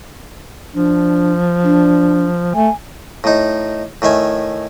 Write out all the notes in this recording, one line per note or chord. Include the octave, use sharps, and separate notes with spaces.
F3 D4
D4
A3 G#5
A2 D#4
A2 D#3 E5 G#5